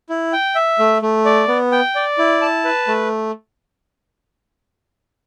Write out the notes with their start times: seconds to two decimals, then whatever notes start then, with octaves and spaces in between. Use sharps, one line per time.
0.09 E4
0.33 G5
0.55 E5
0.79 A3
1.02 A3
1.25 D5
1.48 B3
1.72 G5
1.95 D5
2.18 E4
2.41 A5
2.65 B4
2.88 A3